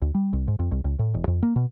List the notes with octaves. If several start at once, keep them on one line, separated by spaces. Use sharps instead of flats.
D2
G3
C2
G#2
F2
C2
C#2
A2
E1
F2
A#3
B2